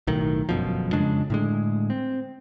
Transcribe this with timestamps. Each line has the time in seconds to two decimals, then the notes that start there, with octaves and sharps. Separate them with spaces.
0.07 B1 A2 D#3
0.49 G1 F#2 B2 F3
0.93 F2 C#3 G#3 D4
1.30 A2 D3 G#3
1.90 C4